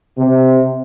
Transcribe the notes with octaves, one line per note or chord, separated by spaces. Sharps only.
C3